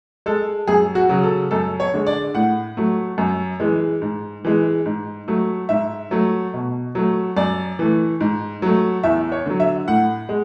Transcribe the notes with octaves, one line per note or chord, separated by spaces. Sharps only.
G#3 A4
F#2 G#4
F#4
C#3 F#3
A4
F#2 A4
C#5
D3 G#3
D5
A2 F#5
F#3 A3
F#2
E3 G#3
G#2
E3 G#3
G#2
F#3 A3
G#2 E5
F#3 A3
B2
F#3 A3
F#2 D5
E3 A3
G#2
F#3 A3
E2 E5
C#5
D3 F#3
E5
A2 F#5
G#3